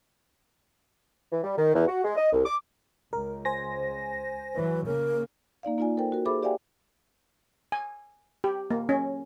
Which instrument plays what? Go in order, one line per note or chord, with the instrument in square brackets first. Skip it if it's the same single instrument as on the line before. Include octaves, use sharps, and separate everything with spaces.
[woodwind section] E3
G3
D#3
E2
F#4
G#3
D#5
C2
D6
[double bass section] C#2 [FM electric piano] A#4
[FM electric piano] C5 G#5 A#6
[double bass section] E3 F#3 [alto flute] B4
[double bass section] C#3 A#3 [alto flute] A#4
[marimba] A#3 D#4 D5 F5
A#3 D#4 F4 D5 G#5
A4 A#4 C5 G5
F#4 A#4
G#4 A4 C5 E5 B5 D6
G4 D5 E5 F5 G5 G#5
[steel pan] G#5
G4
A#3
C#4